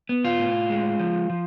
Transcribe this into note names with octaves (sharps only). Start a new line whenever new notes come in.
B3
F4
A2
G#3
F3
F3